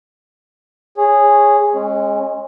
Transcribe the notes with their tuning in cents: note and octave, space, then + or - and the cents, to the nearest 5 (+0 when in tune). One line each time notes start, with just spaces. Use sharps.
G#4 -10 C#5 +0
G#3 +0 C#4 -30